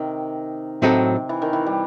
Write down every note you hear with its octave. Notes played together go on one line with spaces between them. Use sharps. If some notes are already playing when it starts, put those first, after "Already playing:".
Already playing: C3 D#3
A2 C3 F#3 C4 D#4 A4
E3
D#3
E3
G3